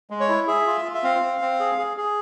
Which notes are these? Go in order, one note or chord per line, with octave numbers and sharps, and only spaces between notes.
G#3
C#5
E4
G#4 E5
F4
F4
E5
C4 F5
C4
C4
G#4
G#4
G#4